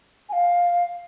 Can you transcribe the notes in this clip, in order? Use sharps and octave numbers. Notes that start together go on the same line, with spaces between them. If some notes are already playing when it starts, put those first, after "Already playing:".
G#5
F5